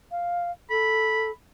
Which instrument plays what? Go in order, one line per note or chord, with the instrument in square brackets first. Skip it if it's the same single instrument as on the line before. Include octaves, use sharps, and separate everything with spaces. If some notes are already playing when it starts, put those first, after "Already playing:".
[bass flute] F5
[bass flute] A4 [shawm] B5